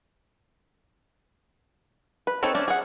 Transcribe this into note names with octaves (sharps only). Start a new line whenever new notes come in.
B4
C4 D#4 A4 C#5
A3 C#4 D4 D5
G#4 F#5